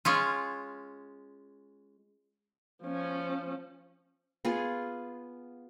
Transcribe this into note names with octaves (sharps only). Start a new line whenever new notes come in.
G#3 C#4 F4
F3 C#4
B3 F4 G#4